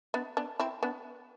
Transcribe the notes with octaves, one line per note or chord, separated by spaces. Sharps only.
B3 D4
B3 D4
C4 E4
B3 D4